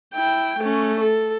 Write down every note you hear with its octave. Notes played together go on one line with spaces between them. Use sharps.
E4 G5
A3 C#4
A4